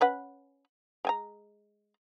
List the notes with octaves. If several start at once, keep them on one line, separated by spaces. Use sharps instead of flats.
C#4 B4 F#5
G#3 G#5 A#5